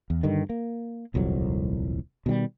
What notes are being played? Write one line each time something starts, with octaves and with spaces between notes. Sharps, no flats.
E2
G2 D3 D#3
A#3
D#1 C2 F2 F#3
B2 D#3 F#3 G3